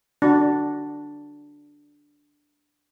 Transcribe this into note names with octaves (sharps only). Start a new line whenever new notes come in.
D4 F#4